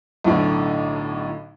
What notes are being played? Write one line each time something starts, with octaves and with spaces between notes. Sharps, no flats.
B1 A2 D3